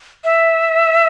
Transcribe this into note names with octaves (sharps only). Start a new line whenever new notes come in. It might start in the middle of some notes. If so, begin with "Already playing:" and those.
E5